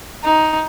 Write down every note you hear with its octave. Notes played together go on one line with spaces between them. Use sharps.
D#4